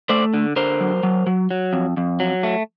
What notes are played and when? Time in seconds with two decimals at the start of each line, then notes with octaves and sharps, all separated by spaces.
0.09 A3 C5 D5
0.34 D3
0.56 D3 A#4 C5
0.80 F#3
1.03 F#3
1.27 F#3
1.51 F#3
1.73 F2
1.97 F2
2.20 F#3
2.43 A3